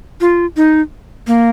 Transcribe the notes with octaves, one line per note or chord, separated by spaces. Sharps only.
F4
D#4
A#3